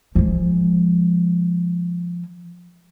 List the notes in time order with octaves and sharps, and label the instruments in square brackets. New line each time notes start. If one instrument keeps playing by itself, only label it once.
[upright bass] F3 G#3